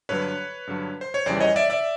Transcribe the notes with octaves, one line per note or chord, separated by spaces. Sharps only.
G2 D3 F#3 B4 C#5
G2 D3 F#3
C5
C#5
F2 C#3 E3 G3 C5 D5
C#5 D#5
D5 E5
D5 E5